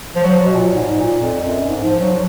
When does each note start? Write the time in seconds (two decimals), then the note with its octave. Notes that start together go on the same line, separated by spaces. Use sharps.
0.16 F3
0.23 F#3
0.45 B2
0.55 A#2
0.72 G#2
0.95 A#2
1.19 F2
1.43 F#2
1.68 G#2
1.84 F3
2.00 F#3